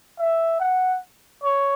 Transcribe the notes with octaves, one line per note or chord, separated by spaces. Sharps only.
E5
F#5
C#5